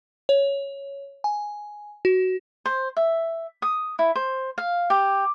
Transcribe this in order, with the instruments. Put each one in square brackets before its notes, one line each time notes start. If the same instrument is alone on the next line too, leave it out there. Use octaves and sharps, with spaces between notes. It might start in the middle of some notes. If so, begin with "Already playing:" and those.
[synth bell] C#5
G#5
F#4
[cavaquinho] C5
E5
D#6
E4
C5
F5
G4